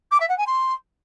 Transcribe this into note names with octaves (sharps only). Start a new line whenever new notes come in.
D6
E5
F#5
G#5
C6